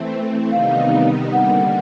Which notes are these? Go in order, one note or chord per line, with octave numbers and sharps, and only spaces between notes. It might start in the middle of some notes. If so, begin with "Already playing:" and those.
Already playing: E3 A3 C4
C3 D#3 G3 B3 D#4 F5
D3 G3 A#3 F#5